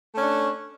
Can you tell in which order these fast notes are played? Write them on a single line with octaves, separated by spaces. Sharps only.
A3 C#4 D4